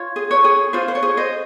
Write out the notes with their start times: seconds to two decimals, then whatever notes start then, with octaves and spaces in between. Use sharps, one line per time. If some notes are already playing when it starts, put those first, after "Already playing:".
Already playing: F4 C#5
0.16 G#4
0.31 C#5
0.44 G#4
0.73 F4 C5
0.88 C5
0.95 C#5
1.03 G#4
1.17 C5 D#5